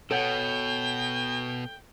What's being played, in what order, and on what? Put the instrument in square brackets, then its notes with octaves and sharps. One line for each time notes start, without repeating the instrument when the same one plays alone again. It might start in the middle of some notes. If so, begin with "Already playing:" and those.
[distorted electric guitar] B2 [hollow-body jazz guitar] A4 C#5 F#5 [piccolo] G5